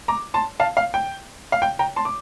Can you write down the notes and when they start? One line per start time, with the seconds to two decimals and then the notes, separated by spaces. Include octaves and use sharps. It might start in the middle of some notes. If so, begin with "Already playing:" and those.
0.08 A#5 D6
0.34 A5 C6
0.60 F5 A5
0.77 F5
0.94 G5
1.52 F5
1.62 G5
1.79 G5 A#5
1.96 A5 C6
2.05 D6